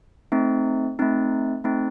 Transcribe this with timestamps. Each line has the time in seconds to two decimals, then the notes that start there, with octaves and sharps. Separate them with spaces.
0.32 A3 C4 D#4
0.99 A3 C4 D#4
1.64 A3 C4 D#4